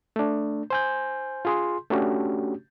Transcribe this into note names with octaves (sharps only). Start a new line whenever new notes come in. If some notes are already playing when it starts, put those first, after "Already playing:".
A3 D4
C5 G#5 G6
F4 G#4 C6
A3 C#4 D4 F#4 G4